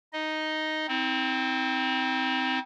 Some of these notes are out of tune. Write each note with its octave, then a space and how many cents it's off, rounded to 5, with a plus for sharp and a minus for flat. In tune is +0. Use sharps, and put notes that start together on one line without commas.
D#4 +0 D#5 +0
C4 -5 D#4 +45